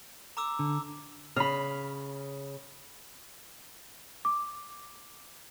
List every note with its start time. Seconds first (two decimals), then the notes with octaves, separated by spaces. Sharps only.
0.37 A#5 D6 E6
0.59 D3
1.36 C#3 B5 F6
4.25 D6